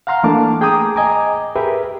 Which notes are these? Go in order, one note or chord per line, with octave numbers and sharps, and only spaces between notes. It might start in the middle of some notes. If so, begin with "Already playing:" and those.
F5 F#5 A#5 C6 F6
E3 A3 A#3 D4 A5 D6
G#4 G5 G#5 A#5 D6 D#6
D#5 G#5 A#5 D6
G4 G#4 A#4 B4 E5